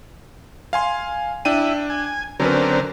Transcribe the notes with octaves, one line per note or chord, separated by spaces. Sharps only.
F5 G#5 C6
D4 E4 G5 D#7
G#5
D3 F#3 C4 C#4 A#4 B4